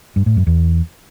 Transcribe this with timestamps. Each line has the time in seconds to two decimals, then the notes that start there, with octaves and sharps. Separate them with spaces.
0.16 G2
0.26 A2
0.36 F#2
0.47 E2